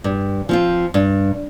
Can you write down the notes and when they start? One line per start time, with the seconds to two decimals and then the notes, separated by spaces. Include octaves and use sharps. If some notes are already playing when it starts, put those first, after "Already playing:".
0.04 G2
0.49 F3 C4 F4
0.94 G2